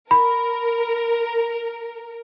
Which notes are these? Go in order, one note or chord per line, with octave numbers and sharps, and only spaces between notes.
A#4 B5